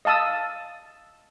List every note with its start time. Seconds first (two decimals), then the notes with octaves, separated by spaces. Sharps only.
0.05 D#5 F5 A5 D#6 E6